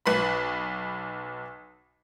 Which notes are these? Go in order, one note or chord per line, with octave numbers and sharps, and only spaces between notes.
B1 B4 B5